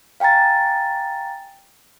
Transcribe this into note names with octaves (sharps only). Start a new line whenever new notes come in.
F5 G5 G#5 A#5 A6